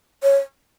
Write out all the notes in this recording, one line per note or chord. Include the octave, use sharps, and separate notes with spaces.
C#5